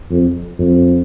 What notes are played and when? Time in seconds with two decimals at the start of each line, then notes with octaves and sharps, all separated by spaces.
0.10 F2
0.59 F2